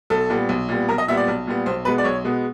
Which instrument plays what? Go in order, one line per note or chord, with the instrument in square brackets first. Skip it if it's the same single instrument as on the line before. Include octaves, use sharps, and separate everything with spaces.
[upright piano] B1 A4
A#2 G3 B3
B1
A#2 G3 B3
B1 A#4
D#5
A#2 G3 B3 E5
D5
B1
A#2 G3 B3
B1 C5
B2 B4
G#3 B3
D5
B1 C#5
B2 G#3 B3